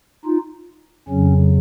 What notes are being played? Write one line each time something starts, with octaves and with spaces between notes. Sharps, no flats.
D#4 F4
F2 C#3 F#3 C#4